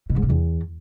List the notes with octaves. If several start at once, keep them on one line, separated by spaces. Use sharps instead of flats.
B2
G#2
C3
E2